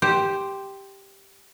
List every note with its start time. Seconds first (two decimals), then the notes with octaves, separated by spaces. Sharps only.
0.02 G4 C5